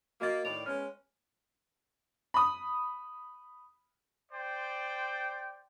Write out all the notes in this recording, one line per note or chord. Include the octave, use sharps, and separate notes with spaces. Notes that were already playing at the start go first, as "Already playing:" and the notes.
A#3 F#4 D#5 A6
A2 D#3 D5 F7
G#3 B3 C#4 C#5 F6
B5 D#6
C5 D5 G5